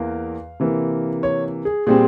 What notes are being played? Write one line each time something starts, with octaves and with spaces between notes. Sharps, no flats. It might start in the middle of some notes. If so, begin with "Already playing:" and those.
Already playing: E2 E3 A#3 F5
C3 E3 A#3
C#5
G#4
A#2 G3 C4 G#4